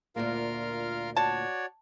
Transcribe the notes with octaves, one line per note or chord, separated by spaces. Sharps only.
D2 A#2 A#3 F4 A#4 F5
F#4 C#5 D5 A5